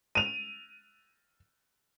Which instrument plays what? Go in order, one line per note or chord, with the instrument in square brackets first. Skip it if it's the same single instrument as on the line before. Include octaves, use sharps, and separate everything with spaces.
[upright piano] D#7 F7